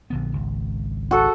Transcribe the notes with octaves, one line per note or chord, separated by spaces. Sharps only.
A#1 D3 B3
G#1 C#2
F#4 A4